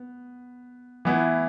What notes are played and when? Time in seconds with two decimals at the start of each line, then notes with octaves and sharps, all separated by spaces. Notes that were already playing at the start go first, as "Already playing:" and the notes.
Already playing: B3
1.05 E3 B3 E4